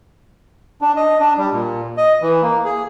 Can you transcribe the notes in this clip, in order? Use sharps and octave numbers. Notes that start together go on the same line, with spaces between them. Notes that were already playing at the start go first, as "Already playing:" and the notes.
D4
D#5
D4
G3
A#2
D#5
E3
A#3
G#4